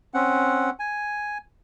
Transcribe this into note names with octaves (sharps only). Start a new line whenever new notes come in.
C4 C#4 F#5
G#5